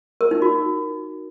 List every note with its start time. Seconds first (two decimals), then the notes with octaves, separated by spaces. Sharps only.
0.21 A#4
0.31 D#4
0.42 F#4